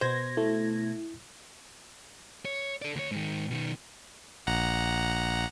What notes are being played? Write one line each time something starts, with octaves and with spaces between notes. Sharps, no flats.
B2 C5 G#6 A#6
A3 E4
C#5
A4 D5
D2 C#5
G#2 D#3
B2 D#3
A#1 F#5 A#5